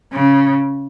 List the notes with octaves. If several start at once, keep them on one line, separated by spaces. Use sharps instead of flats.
C#3